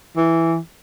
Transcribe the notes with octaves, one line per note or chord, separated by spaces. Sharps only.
E3